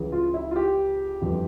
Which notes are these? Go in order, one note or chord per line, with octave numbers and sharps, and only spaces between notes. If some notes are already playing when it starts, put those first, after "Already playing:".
Already playing: C#2 C#3 E3
F4
E4
F4
G4
G1 F2 E3